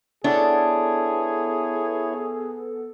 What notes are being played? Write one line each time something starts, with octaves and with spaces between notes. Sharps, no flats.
B3 D4 E4 G#4 A4 C#5